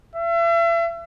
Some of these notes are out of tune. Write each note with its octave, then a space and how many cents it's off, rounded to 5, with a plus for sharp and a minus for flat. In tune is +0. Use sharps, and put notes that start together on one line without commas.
E5 +40